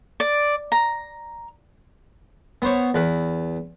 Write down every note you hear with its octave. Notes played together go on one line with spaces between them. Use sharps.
D5
A#5
B3 C5 C#5
E2 B4